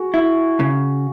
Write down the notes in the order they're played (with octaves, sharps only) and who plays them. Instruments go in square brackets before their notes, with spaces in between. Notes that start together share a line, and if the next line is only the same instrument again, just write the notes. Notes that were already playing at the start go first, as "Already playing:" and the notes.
Already playing: [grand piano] F#4 G#4
[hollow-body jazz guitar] E4
C#3